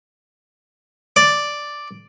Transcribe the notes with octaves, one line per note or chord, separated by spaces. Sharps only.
D5